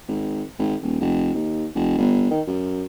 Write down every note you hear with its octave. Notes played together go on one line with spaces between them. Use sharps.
G#1
G#1
D#1
F1
D#2
F1
G1
D#3
F#2